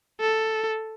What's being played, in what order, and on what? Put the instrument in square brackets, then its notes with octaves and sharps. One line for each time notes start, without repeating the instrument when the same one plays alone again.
[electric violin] A4